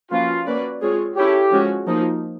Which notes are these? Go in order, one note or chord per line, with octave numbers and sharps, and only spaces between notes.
F3 A#3 C#4 F4 F#4 B4
A#3 C#4 F#4 B4 D5
G#3 C4 F4 G#4 C#5
C#4 E4 G4 A4 C#5
F3 G#3 C#4 F#4
F3 A#3 D#4